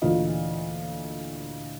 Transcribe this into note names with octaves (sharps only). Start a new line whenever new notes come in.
D2 A#2 E3 F4 D#5